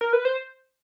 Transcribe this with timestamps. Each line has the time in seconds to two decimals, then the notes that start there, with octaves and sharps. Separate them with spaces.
0.01 A#4
0.13 B4
0.25 C5